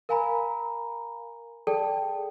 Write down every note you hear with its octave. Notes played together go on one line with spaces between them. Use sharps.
A#4 F5 G#5 A#5 B5
G#4 A4 D5 G5 A5